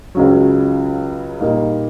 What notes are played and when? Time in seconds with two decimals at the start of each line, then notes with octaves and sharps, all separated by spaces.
0.15 C#2 C#3 F#3
1.40 A#2 G3 A#3 D#4